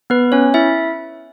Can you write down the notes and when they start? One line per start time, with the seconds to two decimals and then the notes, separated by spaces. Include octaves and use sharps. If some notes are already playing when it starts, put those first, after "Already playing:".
0.10 B3 B4
0.32 C#4 C#5
0.54 E4 E5